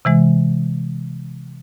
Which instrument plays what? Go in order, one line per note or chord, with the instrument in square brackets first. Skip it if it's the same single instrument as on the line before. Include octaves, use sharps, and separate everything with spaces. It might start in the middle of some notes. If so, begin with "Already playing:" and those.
[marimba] C3 E3 G#3